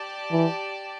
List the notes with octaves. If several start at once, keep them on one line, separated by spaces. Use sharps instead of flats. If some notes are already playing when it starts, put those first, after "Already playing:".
Already playing: G4 D5 A5
E3